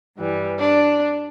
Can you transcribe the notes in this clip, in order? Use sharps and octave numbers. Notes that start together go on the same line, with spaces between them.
G2 E3 G3
D4